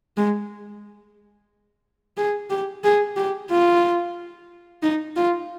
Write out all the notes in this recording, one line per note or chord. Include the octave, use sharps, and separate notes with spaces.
G#3
G#4
G4
G#4
G4
F4
D#4
F4